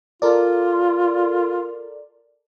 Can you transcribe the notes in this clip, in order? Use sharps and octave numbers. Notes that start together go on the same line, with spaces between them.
F4 A4 A#4 D5